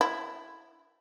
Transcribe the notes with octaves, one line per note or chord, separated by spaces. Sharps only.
E4